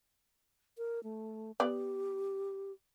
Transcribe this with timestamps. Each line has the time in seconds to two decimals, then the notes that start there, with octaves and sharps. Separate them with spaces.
0.78 A#4
1.03 A3
1.60 B3 G4 D5